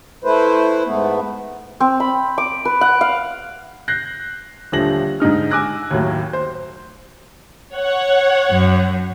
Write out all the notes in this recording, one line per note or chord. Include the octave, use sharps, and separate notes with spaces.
A3 E4 B4 C5
G#2 A3 B3
C4
B5
D6
B4
F#5
F5
F#6 G6 A#6 C7
D#1 D3 F3 A3 A#6 F#7
G#2 D3 D#4 F6
G#5 D6 E6 F#6 A#6
D#2 A2 F#3
C5
C#5 F#5
F#2